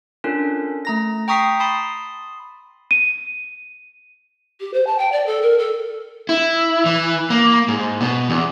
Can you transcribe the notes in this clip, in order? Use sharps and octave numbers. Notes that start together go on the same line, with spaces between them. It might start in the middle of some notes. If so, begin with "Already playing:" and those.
C#4 D4 F4 A4 A#4
A3 A#5 A#6
G5 A#5 C#6 D#6 B6 C7
A5 B5 C6 D#6 C7
D#7
G4
C5
A5
G5
D5
A4
A#4
A4
E4
E3
A#3
G#2
B2
E2